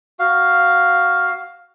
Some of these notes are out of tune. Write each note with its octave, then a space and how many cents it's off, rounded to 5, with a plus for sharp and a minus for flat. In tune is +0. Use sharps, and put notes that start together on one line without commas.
F#4 +10 F5 +0